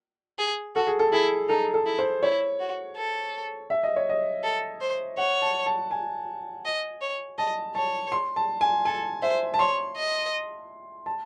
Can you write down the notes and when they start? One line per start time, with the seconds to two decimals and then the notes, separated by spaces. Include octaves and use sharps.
0.38 G#4
0.75 F#4 A4
0.87 G#4
0.99 A4
1.12 E4 G#4
1.49 D#4 A4
1.74 A4
1.86 E4
1.99 C5
2.23 E4 C#5
2.60 F#4
2.96 A4
3.70 E5
3.83 D#5
3.96 C#5
4.09 D#5
4.43 A4
4.81 C5
5.17 C#5 F#5
5.42 A5
5.66 A5
5.91 G#5
6.65 D#5
7.01 C#5
7.38 D#5 A5
7.75 C#5 A5
8.12 C6
8.36 A5
8.61 G#5
8.85 A4 G#5
9.22 C5 E5
9.54 A5
9.59 C#5 C6
9.96 D#5
11.06 A5